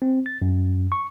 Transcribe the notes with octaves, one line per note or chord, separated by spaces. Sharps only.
C4
A6
F#2
C#6